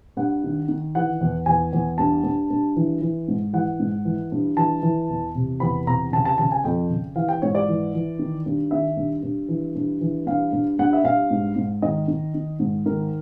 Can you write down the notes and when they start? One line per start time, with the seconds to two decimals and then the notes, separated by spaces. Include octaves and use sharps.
0.17 G2 F#5
0.44 D#3
0.68 D#3
0.95 E3 F#5
1.21 E2
1.46 E2 G#5
1.73 E2
1.98 G2 A5
2.24 G2
2.50 G2
2.76 E3
3.01 E3
3.28 G#2
3.53 E3 F#5
3.80 G#2
4.05 E3
4.32 G2
4.57 E3 A5
4.83 E3
5.09 E2
5.35 C3
5.60 E2 B5
5.87 C3 A#5
6.12 C#3 A5
6.25 A5
6.38 C#3 A5
6.52 G#5
6.64 F2 G5
6.90 C#3
7.16 E3 F5
7.29 G5
7.42 G#2 C#5
7.55 D5
7.69 E3
7.94 E3
8.19 D#3
8.46 G2
8.71 D#3 E5
8.97 G2
9.23 G2
9.49 E3
9.75 G2
10.01 E3
10.27 G2 F5
10.52 G2
10.79 G2 F#5
10.93 E5
11.04 G2 F5
11.30 G#2
11.56 G#2
11.82 D#3 D#5
12.08 D#3
12.34 D#3
12.59 G#2
12.86 D#3 A#4